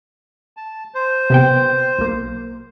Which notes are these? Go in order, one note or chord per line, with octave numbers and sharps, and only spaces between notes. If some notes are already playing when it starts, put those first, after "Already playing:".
A5
C5
C3 B3 G5
B1 A#3